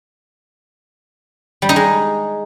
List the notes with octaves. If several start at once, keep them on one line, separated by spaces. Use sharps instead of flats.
G3
D#4
G#3